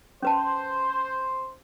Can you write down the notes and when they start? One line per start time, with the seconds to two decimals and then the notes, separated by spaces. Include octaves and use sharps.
0.22 C#4 B4 C5 A5